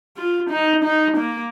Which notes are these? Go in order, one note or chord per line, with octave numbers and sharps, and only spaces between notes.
F4
D#4
D#4
A#3